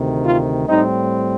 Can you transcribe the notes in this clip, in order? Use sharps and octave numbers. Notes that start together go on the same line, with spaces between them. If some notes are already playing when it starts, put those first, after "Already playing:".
Already playing: D2 C3 D#3
F4
A2 G3 C4 D#4